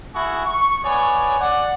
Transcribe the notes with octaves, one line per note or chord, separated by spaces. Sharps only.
E4 F#4 G#4 C#6
C#6
B3 C#5 D5 G#5
D5 F#5